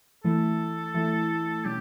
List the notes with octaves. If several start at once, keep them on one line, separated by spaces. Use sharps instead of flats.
E3 A3 E4 A4
E3 A3 E4
B2 G3 C#4 G4